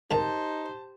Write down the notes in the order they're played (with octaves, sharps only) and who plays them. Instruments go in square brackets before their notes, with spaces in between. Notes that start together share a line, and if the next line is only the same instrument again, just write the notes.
[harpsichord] C2 G#2 D#3 [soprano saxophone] D#4 [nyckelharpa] G4 C5 [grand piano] A5